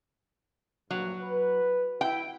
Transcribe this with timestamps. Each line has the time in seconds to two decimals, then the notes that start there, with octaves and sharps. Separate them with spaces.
0.91 A#1 G2 F#3
1.22 B4
2.01 E4 G5